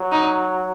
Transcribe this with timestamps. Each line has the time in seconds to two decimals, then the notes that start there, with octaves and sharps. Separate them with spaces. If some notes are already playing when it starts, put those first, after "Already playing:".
Already playing: F#3
0.12 D#4